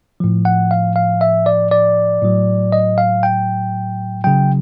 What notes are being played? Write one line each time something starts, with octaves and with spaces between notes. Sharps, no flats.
A2 F3
F#5
F5
F5
E5
D5
D5
A2 F#3
D#5
F5
G5
C#3 F#3 G5